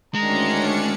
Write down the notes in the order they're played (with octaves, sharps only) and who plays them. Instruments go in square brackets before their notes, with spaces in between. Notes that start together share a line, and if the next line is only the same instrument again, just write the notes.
[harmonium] D2 D#3 [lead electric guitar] G#3 [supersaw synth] C#4 D4 C#7 [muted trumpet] A#5